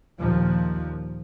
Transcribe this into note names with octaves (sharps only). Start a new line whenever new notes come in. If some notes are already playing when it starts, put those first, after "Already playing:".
D#2 A#2 F3